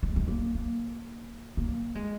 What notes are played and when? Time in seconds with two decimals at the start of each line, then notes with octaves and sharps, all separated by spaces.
0.03 G#3
0.16 G#3
0.28 A#3
0.55 A#3
1.57 A#3
1.95 G#3